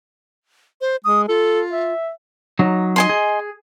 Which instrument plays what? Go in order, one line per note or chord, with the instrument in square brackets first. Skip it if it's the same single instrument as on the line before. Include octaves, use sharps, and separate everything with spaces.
[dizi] C5
[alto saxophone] G#3 [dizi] D#6
[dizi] F4 [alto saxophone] A4
[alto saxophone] E5
[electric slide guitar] F#3 D#4 C#5
[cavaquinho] D#5 G#5 C6
[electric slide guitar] G#4